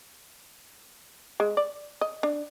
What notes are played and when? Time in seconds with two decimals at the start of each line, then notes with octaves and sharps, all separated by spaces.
1.40 G#3
1.57 D5
2.01 D#5
2.23 D4